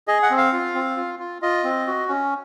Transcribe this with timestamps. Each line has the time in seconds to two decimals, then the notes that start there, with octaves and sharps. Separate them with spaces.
0.08 G#4 D#5
0.23 F#5
0.31 C4
0.38 F5
0.53 F4
0.75 C4
0.97 F4
1.19 F4
1.42 F4 D#5
1.64 C4
1.87 F#4
2.09 C#4